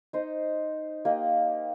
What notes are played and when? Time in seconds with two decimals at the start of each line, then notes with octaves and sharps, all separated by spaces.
0.13 D#4 C5 D#5
1.05 A#3 G4 D#5